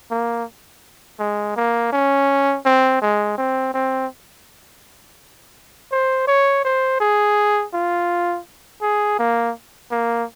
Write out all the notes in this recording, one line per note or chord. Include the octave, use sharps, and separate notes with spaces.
A#3
G#3
A#3
C#4
C4
G#3
C4
C4
C5
C#5
C5
G#4
F4
G#4
A#3
A#3